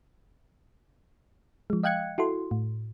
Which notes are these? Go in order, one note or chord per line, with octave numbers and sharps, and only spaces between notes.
F3 G#3
D#5 F5 G5 F#6 G#6 C#7
E4 F#4 A4 C6
A2